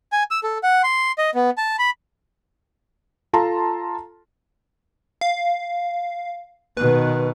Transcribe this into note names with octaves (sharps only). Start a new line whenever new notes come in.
G#5
E6
A4
F#5
C6
D#5
B3
A5
B5
F4 A4 A5 A#5 C6
F5
B2 D#3 B4